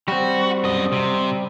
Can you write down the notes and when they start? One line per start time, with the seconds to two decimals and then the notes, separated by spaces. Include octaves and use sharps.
0.08 G3 C4 F#4
0.64 F#2 D#5
0.92 C3